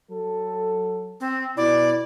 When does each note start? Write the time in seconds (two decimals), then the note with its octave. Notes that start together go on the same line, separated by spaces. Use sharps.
0.11 F#3 A4
1.20 C4
1.57 B2 E4 D5